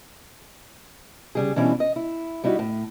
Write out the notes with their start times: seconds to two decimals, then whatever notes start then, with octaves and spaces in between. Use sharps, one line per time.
1.35 C#3 G3 G#4
1.56 B2 E3 G3 C#4 D4 E4
1.80 D#5
1.96 E4
2.44 G3 D#4 E4 F#4
2.59 A2